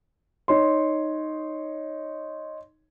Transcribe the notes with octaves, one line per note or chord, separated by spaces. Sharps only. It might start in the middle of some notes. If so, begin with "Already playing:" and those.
D#4 C#5 C6